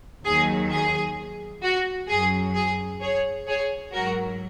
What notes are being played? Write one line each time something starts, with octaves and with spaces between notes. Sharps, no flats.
D#2 D#3 F#3 G#4
G#4
F#4
F#2 F#3 G#4
G#4
G#4 C#5
G#4 C#5
G#2 F#3 F#4 A#4